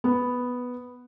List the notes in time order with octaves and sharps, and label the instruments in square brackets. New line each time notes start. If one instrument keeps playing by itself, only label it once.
[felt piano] B3